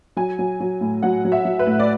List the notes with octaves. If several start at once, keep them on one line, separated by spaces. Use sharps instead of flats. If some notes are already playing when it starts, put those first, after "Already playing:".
F#3 G#5
F#3
F#3
A2
F#3 F#5
F#3
E5
F#3
B4
A2
D5